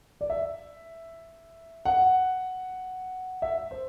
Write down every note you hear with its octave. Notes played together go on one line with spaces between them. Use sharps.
D5
E5
F#5
E5
C5